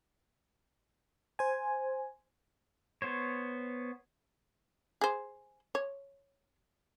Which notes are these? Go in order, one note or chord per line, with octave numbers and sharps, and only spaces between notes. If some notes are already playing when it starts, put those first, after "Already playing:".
C5 G#5
B3 C5 C#5
G#4 C5
C#5